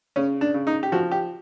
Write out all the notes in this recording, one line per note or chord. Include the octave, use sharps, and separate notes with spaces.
C#3 C#4
D4
C#3
D#4
G4
F3 F#4
G4